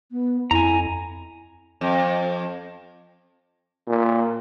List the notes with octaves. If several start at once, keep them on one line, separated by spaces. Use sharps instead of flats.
B3
F2 E4 G#5 A#5
F2
A#2